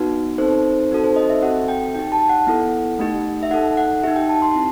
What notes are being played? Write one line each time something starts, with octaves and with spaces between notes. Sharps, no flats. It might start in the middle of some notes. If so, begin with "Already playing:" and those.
Already playing: B3 D#4 F#4 B4
C4 D#4 A4 C5
C4 D#4 F#4 A4
C5
D#5
E5
C4 F#4 A4 F#5
G5
D#4 G4 G5
A5
F#5
B3 E4 A4
A3 D#4 G4
E5
D#4 A4 F#5
F#5
D#4 G4 E5
G5
A5
C6
C4 E4 G4